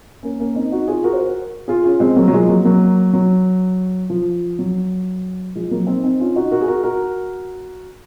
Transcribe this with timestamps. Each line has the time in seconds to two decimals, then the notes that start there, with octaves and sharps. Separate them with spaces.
0.23 A#3 C#4
0.40 A#3 C#4
0.55 C4 D#4
0.72 D#4 F#4
0.88 F4 G#4
1.04 F#4 A#4
1.13 C5
1.19 F#4 A#4
1.68 F4 G#4
1.85 C#4 F4
2.00 G#3 C4
2.16 F#3 A#3
2.28 F#3
2.33 F3 G#3
2.49 F#3 A#3
2.65 F#3 A#3
3.13 F#3
4.10 F3
4.59 F#3
5.55 F3 G#3
5.71 F#3 A#3
5.87 C4 D#4
6.03 C4 D#4
6.20 C#4 F4
6.36 D#4 F#4
6.51 F#4 A#4
6.61 G#4
6.68 F#4 A#4
6.83 F#4 A#4